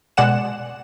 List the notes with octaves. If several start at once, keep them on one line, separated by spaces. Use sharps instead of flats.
B2 G#3 D5 F#5 E7